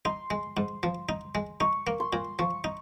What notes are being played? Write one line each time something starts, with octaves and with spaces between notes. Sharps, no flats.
D#4 C6
G#3
G#2
F3
D#4
G#3
D#4 C#6
A#3
C6
A#2
F3 C#6
D#4